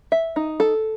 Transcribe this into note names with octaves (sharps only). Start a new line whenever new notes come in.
E5
D#4
A4